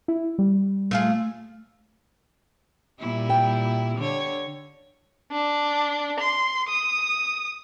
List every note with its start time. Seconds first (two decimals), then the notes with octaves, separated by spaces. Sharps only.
0.08 E4
0.39 G3
0.91 A3 F4 G#4
3.00 A#2 G3 E4
3.29 G5
3.98 D3 C#5
5.32 D4
6.20 C6
6.69 D#6